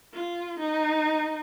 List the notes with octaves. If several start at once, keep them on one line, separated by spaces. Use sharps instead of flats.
F4
D#4